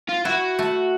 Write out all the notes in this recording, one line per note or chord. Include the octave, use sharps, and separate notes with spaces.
F4
E4 F#4
A3